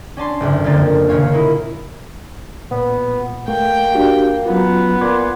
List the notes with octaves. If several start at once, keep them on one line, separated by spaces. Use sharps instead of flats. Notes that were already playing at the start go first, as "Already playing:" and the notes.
C#4 D4 A5 C6
F#1 D2 G#2
F2 D3 A3 A#3 A6
A4
D#1 A#2 C#3 C#5 F5
A#3 D#4 E4
A#2 B3
A3 A#3 G5
D4 F#4 G4
F#3 B3 C#4 F4
A#2 C6 D6 G#6